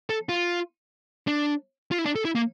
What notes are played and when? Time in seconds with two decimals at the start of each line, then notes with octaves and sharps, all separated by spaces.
0.10 A4
0.29 F4
1.27 D4
1.92 F4
1.99 E4
2.06 D4
2.15 A4
2.25 E4
2.35 A#3